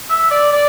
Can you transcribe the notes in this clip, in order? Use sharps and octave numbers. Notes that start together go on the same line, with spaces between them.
E5
D5
D5